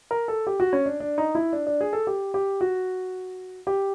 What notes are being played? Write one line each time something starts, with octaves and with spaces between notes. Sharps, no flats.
A#4
A4
G4
F#4
C#4
D4
D4
D#4
E4
D4
D4
G#4
A4
G4
G4
F#4
G4